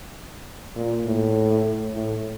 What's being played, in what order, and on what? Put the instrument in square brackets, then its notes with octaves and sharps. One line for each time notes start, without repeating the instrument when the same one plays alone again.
[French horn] A#2
A2
A2